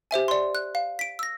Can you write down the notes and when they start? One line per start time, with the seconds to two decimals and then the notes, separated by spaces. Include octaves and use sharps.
0.11 G4 C5 E5 G#5
0.28 D5 C6
0.55 F#6
0.75 F5
0.99 B6 D7
1.19 E6 A#6